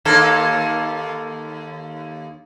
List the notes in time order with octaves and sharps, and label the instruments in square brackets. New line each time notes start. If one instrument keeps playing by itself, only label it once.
[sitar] D#2 A#3 A4